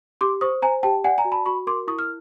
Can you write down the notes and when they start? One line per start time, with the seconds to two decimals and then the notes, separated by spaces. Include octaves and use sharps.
0.21 G4 C6 D6
0.41 C5 C#6 D#6
0.62 C5 G#5 A#5
0.83 G4 G5 A5
1.04 D5 F#5 G#5
1.18 G#5 A#5
1.25 F#4
1.32 A5 B5
1.46 F#4 B5 C#6
1.67 A#4 C6 D6
1.87 E4 C#6 D#6
1.99 F6